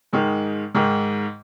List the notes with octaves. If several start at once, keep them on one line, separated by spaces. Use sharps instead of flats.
G#2 D#3 G#3
G#2 D#3 G#3